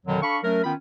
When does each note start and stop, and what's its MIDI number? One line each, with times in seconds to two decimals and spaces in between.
0.06 0.21 41
0.06 0.21 47
0.06 0.21 50
0.06 0.21 51
0.06 0.21 54
0.22 0.38 62
0.22 0.38 69
0.22 0.38 77
0.22 0.38 83
0.22 0.38 85
0.43 0.63 54
0.43 0.63 57
0.43 0.63 61
0.43 0.63 70
0.64 0.73 51
0.64 0.73 59
0.64 0.73 61
0.64 0.73 65
0.64 0.73 79
0.64 0.73 83